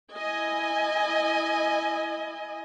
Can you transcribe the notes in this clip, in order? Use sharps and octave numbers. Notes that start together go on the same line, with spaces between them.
E4 D#5 G#5